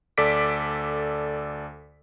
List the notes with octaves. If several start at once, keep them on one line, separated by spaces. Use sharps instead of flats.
D2 A4 D5 D6 B6 D7